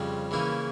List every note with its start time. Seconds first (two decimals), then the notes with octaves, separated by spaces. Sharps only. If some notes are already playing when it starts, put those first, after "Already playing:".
Already playing: F2 C#3 G3 C4
0.31 C#3 E3 A#3 C#4 E4